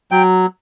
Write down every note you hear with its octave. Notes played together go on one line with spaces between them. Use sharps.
F#3 G5